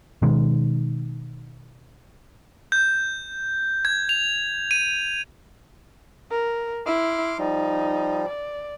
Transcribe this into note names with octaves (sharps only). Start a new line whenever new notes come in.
B2 D#3 G#3
G6
G#6
F7
D#7
A#4
E4 C6 D6 F6
F3 G3 D#4
D5